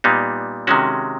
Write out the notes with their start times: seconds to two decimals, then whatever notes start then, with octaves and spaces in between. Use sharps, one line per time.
0.04 A#2 G3 B3 D#4
0.67 C3 D#3 G#3 C#4 F#4